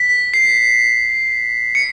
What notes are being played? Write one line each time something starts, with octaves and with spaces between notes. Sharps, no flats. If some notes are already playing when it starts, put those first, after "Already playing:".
Already playing: B6
C7
C#7